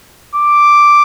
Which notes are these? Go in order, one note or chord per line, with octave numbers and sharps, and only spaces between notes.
D6